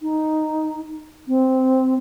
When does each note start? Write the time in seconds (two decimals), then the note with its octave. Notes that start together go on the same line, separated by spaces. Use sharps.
0.01 D#4
1.28 C4